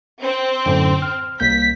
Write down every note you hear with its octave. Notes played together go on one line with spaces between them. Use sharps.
C4
F#2 A2 D3
F6
C2 A#3 G6 B6